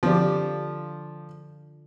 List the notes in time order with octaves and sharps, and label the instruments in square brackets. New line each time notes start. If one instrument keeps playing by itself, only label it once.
[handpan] D3 F4 D5 [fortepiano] F3 G4